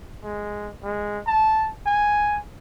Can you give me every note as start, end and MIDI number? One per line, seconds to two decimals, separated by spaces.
0.23 0.70 56
0.83 1.19 56
1.27 1.68 81
1.86 2.40 80